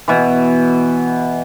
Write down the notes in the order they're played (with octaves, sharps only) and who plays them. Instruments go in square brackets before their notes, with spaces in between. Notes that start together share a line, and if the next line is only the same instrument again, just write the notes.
[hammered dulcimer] B2 E3